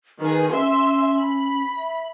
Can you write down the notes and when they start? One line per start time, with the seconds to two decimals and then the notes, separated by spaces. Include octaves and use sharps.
0.20 D#3 G#4 B4
0.52 C#4 E5 C6
1.17 B5
1.76 E5